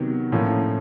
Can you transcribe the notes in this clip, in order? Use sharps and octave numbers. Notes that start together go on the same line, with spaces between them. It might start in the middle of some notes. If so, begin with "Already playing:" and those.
Already playing: C3 D#3 F#3 B3
A2 F3 A#3 C#4